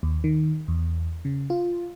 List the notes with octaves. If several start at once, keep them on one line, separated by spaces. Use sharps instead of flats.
D#2
D#3
E2
C#3
F4